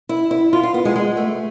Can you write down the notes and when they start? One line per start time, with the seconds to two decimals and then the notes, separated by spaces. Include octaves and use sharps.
0.09 E4
0.31 E4
0.53 F4
0.63 F4
0.74 B3
0.85 G#3
0.96 G#3
1.17 A3